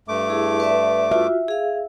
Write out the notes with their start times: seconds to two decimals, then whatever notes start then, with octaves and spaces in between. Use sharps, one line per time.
0.08 G2 A3 D6
0.29 E4 G#4
0.60 B4 D5 E5
1.11 F4 F#4 E5
1.48 G#4 F5